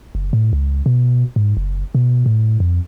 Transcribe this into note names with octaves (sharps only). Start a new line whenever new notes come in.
F#1
A2
C#2
B2
G#2
F#1
B2
A2
F2